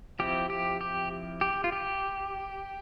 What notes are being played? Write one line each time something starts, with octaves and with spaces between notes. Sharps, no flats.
F3 C4 E4 G4
G4
G4
G4
F4
G4